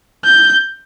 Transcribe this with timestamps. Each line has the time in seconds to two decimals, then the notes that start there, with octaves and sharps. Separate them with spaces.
0.25 G6